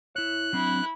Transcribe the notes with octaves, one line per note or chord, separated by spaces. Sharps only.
E4 C#5 F#6
F#3 C4 D4 E4